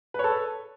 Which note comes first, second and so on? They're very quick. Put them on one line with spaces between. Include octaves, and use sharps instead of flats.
B4 C#5 A4